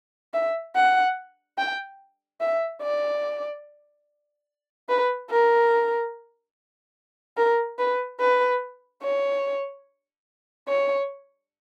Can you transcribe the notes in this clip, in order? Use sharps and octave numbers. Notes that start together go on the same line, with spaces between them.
E5
F#5
G5
E5
D5
B4
A#4
A#4
B4
B4
C#5
C#5